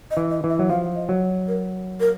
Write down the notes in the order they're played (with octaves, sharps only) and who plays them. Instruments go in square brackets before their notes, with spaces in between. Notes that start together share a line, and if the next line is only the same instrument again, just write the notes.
[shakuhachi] D#5
[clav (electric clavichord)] E3
[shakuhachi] D#5
[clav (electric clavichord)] E3
[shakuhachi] E5
[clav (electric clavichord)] F#3
[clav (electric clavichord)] F3 [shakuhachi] F5
[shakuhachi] D#5
[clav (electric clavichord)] F#3
[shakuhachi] A#4
A#4